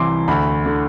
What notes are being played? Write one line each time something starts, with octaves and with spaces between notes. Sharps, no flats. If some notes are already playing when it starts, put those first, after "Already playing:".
Already playing: C2 C3 E3 C6 D6
D2 B5
D3